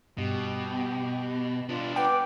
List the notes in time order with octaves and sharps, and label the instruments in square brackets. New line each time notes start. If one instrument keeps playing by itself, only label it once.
[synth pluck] G2 [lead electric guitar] B2 [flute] G4
[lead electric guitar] B3 D4 [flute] F4
[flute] B4 [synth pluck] F#5 G5 D6